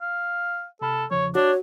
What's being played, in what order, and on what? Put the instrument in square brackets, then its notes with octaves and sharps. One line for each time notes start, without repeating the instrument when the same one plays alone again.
[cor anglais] F5
[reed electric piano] C3 B5 F6 [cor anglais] A4
[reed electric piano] E2 C#3 F3 [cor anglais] C#5
[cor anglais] D4 [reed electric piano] F#4 [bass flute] C#5